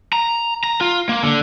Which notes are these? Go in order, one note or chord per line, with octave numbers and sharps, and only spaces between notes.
A#5
A#5
F4
A#3
D3